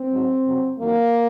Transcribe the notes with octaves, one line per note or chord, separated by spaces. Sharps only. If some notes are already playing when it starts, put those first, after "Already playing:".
Already playing: C4
G#2 F#3
F2 C3 F#3
F2 D#3 F#3 A#3